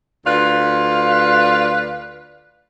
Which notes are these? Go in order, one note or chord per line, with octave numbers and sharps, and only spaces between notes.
D2 F4 B4 D5 F5